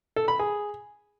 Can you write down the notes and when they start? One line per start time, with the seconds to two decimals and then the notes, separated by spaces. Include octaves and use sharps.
0.16 A4
0.28 B5
0.39 G#4